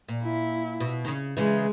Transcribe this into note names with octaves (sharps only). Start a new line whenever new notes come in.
A#2
E4
B2
D#3
C#3
C#3 E3 G#3